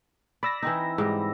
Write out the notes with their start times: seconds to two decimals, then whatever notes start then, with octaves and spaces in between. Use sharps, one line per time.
0.43 D5 B5 E6 A#6
0.63 E3 C4 D#4
0.98 G#2 G3